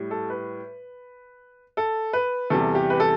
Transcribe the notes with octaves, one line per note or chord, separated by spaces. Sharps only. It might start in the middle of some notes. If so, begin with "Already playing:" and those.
Already playing: A2 G3
A4
B4
A4
B4
E2 C3 G3 A4
G4
B4
A4